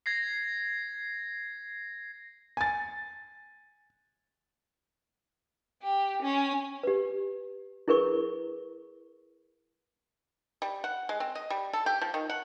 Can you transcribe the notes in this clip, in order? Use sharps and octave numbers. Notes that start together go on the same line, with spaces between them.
G#6 A#6 C7
G#5 A6
G4
C#4
G4 B4
E4 G#4 A#4 B4 C#6
G3
F#5
G#3
C4
D#5
G3
A4
G4
F3
D#3
F#5